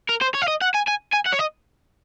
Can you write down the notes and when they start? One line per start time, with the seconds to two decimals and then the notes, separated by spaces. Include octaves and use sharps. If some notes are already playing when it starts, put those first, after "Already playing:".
0.09 A#4
0.21 C5
0.34 C#5
0.42 F5
0.48 D#5
0.61 F#5
0.74 G#5
0.87 G#5
1.13 G#5
1.26 F#5
1.32 C#5
1.39 D#5